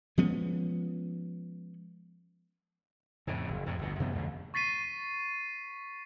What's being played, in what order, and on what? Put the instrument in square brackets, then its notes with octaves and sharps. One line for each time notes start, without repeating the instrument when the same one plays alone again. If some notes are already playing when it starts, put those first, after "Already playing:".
[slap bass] F3 G#3 B3 C#4
F2 A2 C#3
F#1
F2 A2 C3
G1 D2 B2
F#2 C3 E3 B3
A#1 F2 D3 A3
[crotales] C#6 A6 B6 C7 D#7